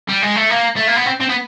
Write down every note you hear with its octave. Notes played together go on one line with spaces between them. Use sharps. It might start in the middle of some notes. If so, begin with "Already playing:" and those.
G3
G#3
A3
A#3
A3
A#3
B3
C4
C4
B3